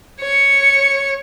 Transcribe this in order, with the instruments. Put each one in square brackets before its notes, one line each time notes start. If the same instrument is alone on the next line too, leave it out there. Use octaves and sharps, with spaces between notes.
[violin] C#5 C#7